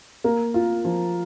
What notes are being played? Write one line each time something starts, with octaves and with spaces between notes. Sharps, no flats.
A#3
F4
F3